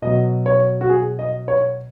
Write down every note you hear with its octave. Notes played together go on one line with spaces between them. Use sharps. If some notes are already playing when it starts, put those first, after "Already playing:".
B2 F#3 D#5
C#5
F#4
G#4
D#5
C#5